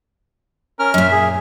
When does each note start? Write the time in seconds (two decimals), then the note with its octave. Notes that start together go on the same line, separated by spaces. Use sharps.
0.79 C#4 A#4 F6
0.94 F#2 A#2 E5
1.11 G#4